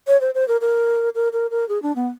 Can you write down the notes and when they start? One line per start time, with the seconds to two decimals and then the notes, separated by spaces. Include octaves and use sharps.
0.07 C#5
0.21 C5
0.34 C5
0.48 A#4
0.61 A#4
1.15 A#4
1.32 A#4
1.51 A#4
1.69 G#4
1.82 D4
1.96 B3